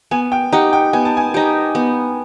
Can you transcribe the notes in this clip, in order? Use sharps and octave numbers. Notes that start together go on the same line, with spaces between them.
B3 G#5
G5
D#4 G4 F#5
G5
B3 G#5
A5
G#5
D#4 G4
B3